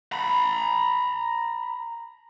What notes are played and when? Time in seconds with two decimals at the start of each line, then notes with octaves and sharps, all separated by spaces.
0.13 A#5 B5